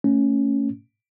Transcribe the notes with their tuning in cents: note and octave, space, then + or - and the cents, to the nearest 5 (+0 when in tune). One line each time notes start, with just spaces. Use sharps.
A3 +30 C#4 +0